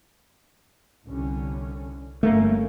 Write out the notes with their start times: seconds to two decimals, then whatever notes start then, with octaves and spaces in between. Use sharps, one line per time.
1.06 C2 D3 C#4
2.23 G1 A3 A#3 C#4